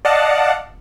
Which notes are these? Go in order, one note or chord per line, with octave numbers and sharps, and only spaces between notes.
D5 D#5 F5 F#5 A5